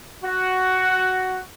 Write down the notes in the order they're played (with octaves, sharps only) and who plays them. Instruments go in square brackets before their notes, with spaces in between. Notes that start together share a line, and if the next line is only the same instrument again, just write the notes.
[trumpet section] F#4